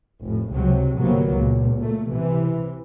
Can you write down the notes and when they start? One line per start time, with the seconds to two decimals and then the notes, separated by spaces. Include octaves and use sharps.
0.23 F1 A2
0.53 C#2 C3 F#3
0.99 G1 C3 F#3 A#3 B3
1.32 C#2 A#2
1.78 A#2 A3
2.10 C3 E3